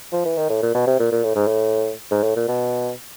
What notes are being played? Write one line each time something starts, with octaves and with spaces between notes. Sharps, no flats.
F3
E3
D#3
A2
A#2
B2
C3
A#2
A#2
A2
G#2
A2
G#2
A2
A#2
B2